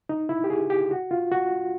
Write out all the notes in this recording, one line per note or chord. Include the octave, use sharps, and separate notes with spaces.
D#4
E4
G4
G#4
G4
F#4
F4
F#4